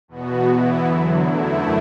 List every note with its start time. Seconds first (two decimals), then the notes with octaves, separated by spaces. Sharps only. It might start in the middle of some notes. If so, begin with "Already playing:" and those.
0.08 E2 B2 B3 F#4
0.46 E3 B3 E4
0.84 E2 D3 F#3
1.22 F#2 D3 A3 E4